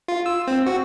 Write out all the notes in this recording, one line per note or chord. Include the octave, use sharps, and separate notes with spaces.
F4
E6
C4
F#4